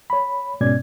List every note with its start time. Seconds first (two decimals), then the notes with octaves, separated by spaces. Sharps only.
0.10 C#5 B5
0.61 G#2 B2 C#4 D5 G#6